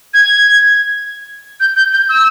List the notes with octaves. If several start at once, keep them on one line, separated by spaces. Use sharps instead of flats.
G#6
G6
G6
G6
E6